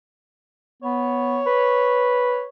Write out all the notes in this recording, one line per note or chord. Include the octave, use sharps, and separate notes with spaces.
B3 C#5
B4